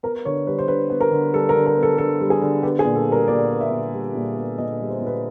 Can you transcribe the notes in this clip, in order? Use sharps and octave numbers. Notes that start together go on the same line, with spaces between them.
B3 A#4
D3 C#5
G3 B4
C5
D3 B4
B3
A#4
D3
G3 A4
A#4
D3
A#4
B3
A4
D3 A4
G3
G#4
D3
B3 G4
G#4
A#2
A4
G3 A#4
A#2 D5
B3
E5
A#2
G3
A#2
B3
A#2 D#5
G3
C5
A#2
B4